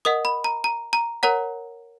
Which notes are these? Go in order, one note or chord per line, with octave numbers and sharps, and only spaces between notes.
A#4 D#5 F#5 D#6
B5
A#5
A#5
A#5
A#4 C#5 F#5 A#5